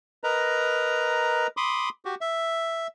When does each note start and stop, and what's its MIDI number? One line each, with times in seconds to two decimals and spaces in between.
0.24 1.47 70
0.24 1.47 71
0.24 1.47 75
0.24 1.47 82
1.57 1.89 83
1.57 1.89 84
1.57 1.89 86
1.57 1.89 87
2.05 2.15 66
2.05 2.15 67
2.21 2.87 76